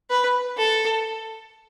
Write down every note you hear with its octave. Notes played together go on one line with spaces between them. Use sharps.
B4
A4